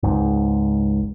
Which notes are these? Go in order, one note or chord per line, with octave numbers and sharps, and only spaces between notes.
G#1 C#2 G#2